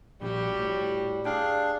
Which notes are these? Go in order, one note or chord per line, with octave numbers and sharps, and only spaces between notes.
A#1 G3 F#4 G4
A2
D4 G#4 F5 G5